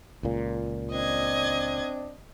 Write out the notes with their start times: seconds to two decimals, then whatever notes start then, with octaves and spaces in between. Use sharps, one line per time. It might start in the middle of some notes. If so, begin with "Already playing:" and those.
0.23 C#2 A#2
0.92 C4 D4 D#5 G#6